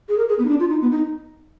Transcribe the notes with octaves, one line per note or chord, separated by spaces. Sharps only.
G#4
A#4
G#4
B3
D#4
D4
F4
D#4
B3
D#4